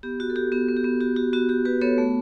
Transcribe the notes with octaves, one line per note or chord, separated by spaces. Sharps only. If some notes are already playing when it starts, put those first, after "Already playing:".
B3 G4
F#4
A4
F#4 G4
B3 G4
B3
G4
B3
F#4 G4
F#4 G4
B3 F#4
F#4 G4
F#4 G4 B4
B3 A4 C#5
A3